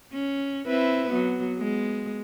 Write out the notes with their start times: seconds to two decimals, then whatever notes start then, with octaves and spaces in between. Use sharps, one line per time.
0.13 C#4
0.67 C4 E4 B4
1.11 F#3 B3
1.58 G#3 B3